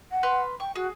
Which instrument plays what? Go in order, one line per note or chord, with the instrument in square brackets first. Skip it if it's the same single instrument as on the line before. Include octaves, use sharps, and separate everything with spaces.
[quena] F#5
[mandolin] B4 C6 F6
[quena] G5 [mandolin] C#6
[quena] F#4 [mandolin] G#4